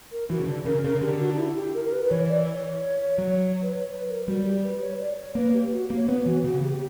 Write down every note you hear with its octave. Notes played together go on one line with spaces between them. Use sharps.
A#4
E3 F#4
C#3
D3
C#3 A#4
C#3 A#4
C#3
D3 G4
F#4
D4
E4
G4
A#4
A#4
B4
B4
E3 C#5
D5
C#5
F#3
B4
C#5
B4
A#4
G3 F#4
G4
B4
C#5
D5
C#5
A#3 B4
G4
F#4
A#3
C#5
B3 B4
E3 F#4
C#3 F#4
G4
G4